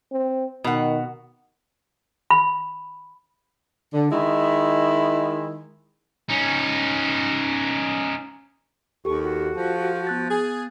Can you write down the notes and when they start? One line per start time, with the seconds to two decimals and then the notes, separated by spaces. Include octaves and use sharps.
0.12 C4
0.64 B2 D#3 F#5
2.30 B5
3.94 D3
4.11 D#3 G#3 E4
6.29 C#4 D#4
9.05 D#2 G4 A4 C#6
9.23 F#4
9.56 F3
10.07 B3 F#6 A6
10.29 G#4